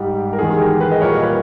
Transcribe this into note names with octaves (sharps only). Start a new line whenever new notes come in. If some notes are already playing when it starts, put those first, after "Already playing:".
Already playing: G#2 G3 G4
A#4
E2 D#3 G#3 G#4
G4 A#4
G#4 B4
D#5
A#2 G3 A#4 C#5
B4 D#5